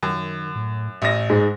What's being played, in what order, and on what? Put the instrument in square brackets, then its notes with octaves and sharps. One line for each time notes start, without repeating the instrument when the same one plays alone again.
[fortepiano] F#2 [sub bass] D#3
[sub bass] A2
[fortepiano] A1 [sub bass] A2 [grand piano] E5 D#6 A#6
[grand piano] G#2 G#3